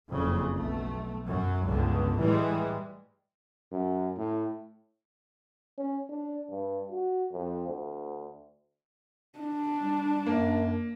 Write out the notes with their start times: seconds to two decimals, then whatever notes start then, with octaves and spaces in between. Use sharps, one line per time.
0.10 F#1 F2 C#3
0.56 B1 A3
1.27 F#2 F#3
1.67 G1 C#2 D3
2.19 A2 E3 G3 G#3
3.71 F#2
4.17 A2
5.78 C#4
6.09 D4
6.50 G2
6.91 F#4
7.32 F2
7.68 D2
9.39 D4
9.81 G3
10.26 F#2 A#3